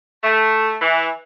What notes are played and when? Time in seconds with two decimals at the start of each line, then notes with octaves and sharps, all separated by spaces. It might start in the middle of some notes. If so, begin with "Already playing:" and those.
0.23 A3
0.82 E3